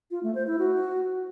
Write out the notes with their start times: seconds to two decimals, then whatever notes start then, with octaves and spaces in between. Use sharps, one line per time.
0.11 F4
0.23 A3
0.35 C5
0.47 E4
0.59 F#4